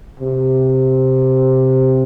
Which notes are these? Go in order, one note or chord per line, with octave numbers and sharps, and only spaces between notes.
C3